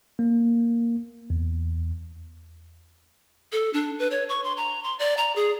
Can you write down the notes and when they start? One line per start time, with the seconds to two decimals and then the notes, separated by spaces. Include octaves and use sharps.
0.19 A#3
1.30 E2
3.52 A4
3.73 D4
3.99 B4
4.11 C#5
4.29 C#6
4.44 C6
4.57 A#5
4.84 C6
4.99 D5
5.17 A#5
5.36 G#4